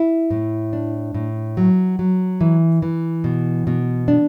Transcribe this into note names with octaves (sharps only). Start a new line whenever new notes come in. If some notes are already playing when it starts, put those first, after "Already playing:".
Already playing: E4
A2
D4
A2
F#3
F#3
E3
E3
B2
B2
D4